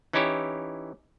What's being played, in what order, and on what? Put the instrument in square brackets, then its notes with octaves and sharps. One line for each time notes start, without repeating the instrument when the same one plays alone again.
[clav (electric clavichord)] E3 C#4 D#4 E4 G4 C#5